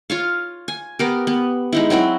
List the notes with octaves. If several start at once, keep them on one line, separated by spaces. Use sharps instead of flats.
F4 C#5 F5
G#5
B3 G4 A#4
B3
G#3 D#4 E4
F#3 C4 E4 F#4